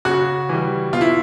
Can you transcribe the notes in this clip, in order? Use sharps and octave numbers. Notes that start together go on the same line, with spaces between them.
C#3 F#4
E3 G3
B2 F4
E4